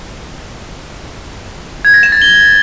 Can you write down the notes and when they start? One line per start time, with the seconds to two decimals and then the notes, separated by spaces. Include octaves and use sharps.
1.85 G#6
1.94 A#6
2.03 E7
2.12 A6
2.22 G7